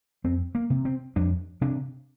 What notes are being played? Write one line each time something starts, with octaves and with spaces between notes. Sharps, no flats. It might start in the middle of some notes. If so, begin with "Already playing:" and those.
F2 C4
A#3
C3
C4
F2 D4
C3 D4